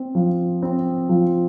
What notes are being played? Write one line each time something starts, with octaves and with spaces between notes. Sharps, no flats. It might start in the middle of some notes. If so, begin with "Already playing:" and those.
Already playing: C4
F3
C4
F3